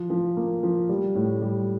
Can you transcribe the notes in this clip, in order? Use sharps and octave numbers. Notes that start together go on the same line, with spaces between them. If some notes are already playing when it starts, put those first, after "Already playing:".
Already playing: F3
F3
A#3
F3
G3
A2
G3